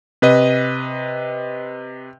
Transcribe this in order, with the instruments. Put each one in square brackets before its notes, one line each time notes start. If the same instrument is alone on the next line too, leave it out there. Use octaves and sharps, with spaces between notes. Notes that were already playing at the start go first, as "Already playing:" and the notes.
[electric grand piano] C3 B4 D#5